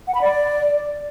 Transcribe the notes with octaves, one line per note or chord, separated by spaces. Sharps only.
F#5
B5
D5